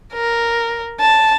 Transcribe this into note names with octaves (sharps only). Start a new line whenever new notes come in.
A#4
A5